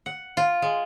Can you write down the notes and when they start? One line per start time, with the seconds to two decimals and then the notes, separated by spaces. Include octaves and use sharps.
0.06 F#5
0.37 F4
0.62 G#3